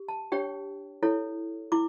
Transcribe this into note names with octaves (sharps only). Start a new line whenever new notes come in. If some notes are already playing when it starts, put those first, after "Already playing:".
Already playing: G4
A5
D4 G4 C#5 G5
E4 A4 C#5
E4 D6